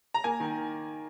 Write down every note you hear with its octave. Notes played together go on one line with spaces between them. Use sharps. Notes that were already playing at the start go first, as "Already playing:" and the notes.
A#5
A#3 G#5
D#3